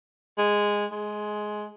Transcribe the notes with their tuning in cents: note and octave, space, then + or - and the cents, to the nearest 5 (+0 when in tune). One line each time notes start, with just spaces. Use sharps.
G#3 -10
G#3 +15